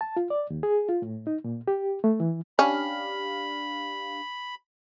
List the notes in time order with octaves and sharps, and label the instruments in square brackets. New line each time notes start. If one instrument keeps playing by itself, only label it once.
[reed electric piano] A5
F4
D5
D#2
G#4
F4
A2
D#4
A#2
G4
A3
E3
[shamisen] C#4 [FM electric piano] D4 G4 F5 [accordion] B5